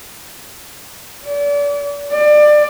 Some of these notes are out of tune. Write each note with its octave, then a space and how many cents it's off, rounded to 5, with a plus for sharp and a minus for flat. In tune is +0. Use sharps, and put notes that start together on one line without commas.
D5 -35
D5 +25